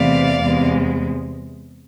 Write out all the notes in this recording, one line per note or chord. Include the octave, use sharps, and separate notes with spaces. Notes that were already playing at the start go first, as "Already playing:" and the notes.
Already playing: E2 C3 E3 A3 D5 F5
E2 C3 G#3